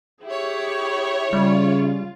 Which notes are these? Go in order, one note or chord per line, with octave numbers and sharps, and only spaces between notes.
E4 G4 G#4 C#5
C#3 G3 F4